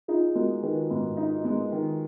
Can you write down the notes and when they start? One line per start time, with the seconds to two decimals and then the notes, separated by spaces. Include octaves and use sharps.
0.08 D#4 F4 G#4
0.35 G#3 F#4 A#4
0.63 D#3 G#4 B4
0.90 G#2
1.17 D#4
1.45 G#3
1.72 D#3